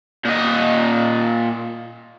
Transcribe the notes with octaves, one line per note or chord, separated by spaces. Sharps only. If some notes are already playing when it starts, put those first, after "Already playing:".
A#2 D#5